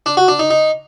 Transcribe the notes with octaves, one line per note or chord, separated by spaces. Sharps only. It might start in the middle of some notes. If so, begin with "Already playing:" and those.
D4
F#4
D4
D#4
D#4